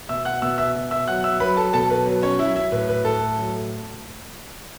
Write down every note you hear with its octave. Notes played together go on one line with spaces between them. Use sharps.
B2 E5 E6
F#5 F#6
B2 E5 E6
E5 E6
B2
E5 E6
F#3 F#5 F#6
E5 E6
F#3 B4 B5
A4 A5
B2 A4 A5
B4
F#3 B4
C#4 C#5
F#3 E4 E5
E4 E5
A2 B4
B4
A2 A4
F#3